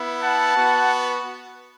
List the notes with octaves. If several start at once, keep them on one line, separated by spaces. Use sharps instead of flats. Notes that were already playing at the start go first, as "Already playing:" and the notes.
Already playing: B3 E4
F#5 A5
B3 F#4